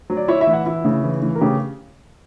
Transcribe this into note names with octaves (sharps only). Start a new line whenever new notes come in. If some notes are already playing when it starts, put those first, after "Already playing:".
F#3
D5
E4 C#5
E5
E3
F#5
E4
C#3
E3
E3
A#4
C#3 G4